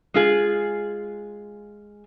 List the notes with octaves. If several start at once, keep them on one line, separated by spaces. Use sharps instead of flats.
G#3 F4 G#4